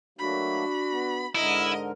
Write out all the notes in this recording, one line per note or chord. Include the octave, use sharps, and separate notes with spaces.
F#3 A3 A#3 D4 F#4 B5
B3
G#2 D3 E4 A#4 D#5